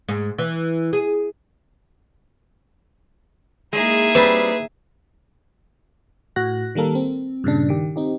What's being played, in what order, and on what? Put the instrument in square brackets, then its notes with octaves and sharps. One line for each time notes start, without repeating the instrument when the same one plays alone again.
[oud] G#2
E3
G#4
[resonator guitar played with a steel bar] G#3 [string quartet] A#3 D#4 E4 [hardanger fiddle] G#4 E5
[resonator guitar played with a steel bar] G3 C4 [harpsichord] B4
[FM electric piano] A2 F#4 F#6 A#6
D#3 G3 A#3 A4 A#4
C4
G2 A#2 C#3 D4
D#3 G4
C4 D#4 G4